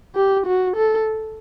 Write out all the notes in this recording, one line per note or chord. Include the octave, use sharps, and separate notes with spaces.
G4
F#4
A4